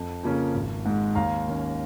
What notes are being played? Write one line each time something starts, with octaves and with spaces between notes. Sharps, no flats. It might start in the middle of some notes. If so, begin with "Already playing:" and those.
Already playing: F2
C#3 F3 A#3 C#4
G#1
G#2 G#3
D#2 F5 A#5
D#3 C#4